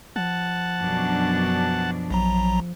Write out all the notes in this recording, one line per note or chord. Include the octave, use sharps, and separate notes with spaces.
F3 F#5 A5
F#2 B2 D4
A#1 F#3 A#5